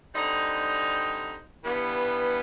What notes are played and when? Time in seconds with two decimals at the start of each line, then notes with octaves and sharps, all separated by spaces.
0.14 D3 G3 C4 D#4
1.65 G2 E3 G3 B3